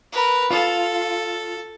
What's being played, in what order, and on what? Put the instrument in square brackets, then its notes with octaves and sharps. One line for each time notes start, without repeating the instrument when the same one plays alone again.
[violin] A#4 B4
[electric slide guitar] F4 [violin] A4